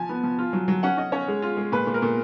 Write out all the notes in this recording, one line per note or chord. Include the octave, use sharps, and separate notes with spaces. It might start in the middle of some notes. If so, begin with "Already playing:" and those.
Already playing: F3 G#5
B3
F3
F4
F#3
F#3
C#4 F#5
C#4 D#5
C#4 C#5
G#3
F4
G#3
A#2 B4
A#2
A#4
A#2